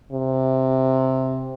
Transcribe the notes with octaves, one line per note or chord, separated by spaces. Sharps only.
C3